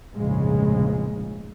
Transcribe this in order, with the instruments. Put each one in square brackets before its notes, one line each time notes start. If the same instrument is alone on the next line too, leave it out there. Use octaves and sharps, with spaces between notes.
[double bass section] F1 A#1 G#2 C#3 G#3